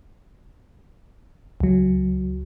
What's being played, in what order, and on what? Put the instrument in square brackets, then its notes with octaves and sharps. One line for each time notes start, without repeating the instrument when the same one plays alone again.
[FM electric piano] C#2 F#3